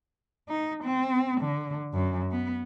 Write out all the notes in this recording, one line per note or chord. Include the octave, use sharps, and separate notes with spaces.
D#4
C4
D3
F#2
B3